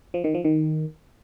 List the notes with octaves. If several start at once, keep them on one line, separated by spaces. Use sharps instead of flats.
F3
D#3
F3
D#3